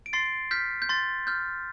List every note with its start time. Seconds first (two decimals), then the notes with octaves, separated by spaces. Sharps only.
0.06 D7
0.13 C6 A6 C7
0.51 F6 G6 B6
0.82 G6
0.89 C6 A6
1.27 F6 G6